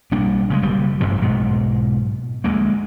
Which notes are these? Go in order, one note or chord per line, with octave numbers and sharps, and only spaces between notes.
B1 G3 A#3 D4
C#3 F3 G#3
F#1 G3
A1 G2 C3 F3
B1 G#2 B2
D2 G#3 A#3